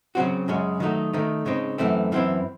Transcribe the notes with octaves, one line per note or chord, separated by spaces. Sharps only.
C#3 F#3 C4 F#4
F#2 C#3 G#3 C#4
D#3 F#3 A3 D#4
D#3 A3 D#4
C#3 G#3 C4 D#4
F#2 E3 A3 C4
F#2 E3 C4 E4